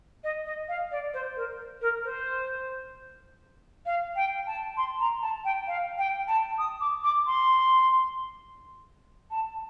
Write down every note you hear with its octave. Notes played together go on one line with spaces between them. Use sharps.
D#5
D#5
F5
D5
C5
A#4
A#4
C5
F5
G5
A5
C6
A#5
A5
G5
F5
G5
A5
D#6
D6
D6
C6
A5